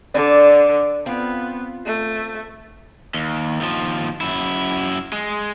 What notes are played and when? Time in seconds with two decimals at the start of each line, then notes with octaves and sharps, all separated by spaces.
0.14 D3 D5
1.06 B3 C4 F4
1.86 A3
3.14 D#2
3.61 D#2 F3
4.21 F#2 E4
5.12 G#3